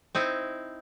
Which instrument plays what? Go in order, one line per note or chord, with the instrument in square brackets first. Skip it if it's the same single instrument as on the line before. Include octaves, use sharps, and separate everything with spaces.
[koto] C4 D#4 E4